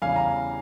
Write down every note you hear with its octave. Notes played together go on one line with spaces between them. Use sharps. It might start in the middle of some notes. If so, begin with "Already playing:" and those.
E2 C#3 E3 G3 C#4 F5 G#5
A#5